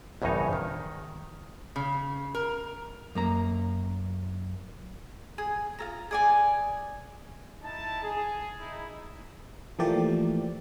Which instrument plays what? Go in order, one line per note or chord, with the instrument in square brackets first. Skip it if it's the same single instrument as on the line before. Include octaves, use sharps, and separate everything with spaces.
[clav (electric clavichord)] A#1 E2 G2 C#3 D#4 C#5
D#3
[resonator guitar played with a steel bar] C#3
A#4
[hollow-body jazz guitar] F#2 A#3 A#5
[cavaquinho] G#4
F4 A4 A#5
G#4 D5 G#5
[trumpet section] D#4 E4 A5
G#4
D#4 E4
[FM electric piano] E3 F3 A3 A#3 G4 D5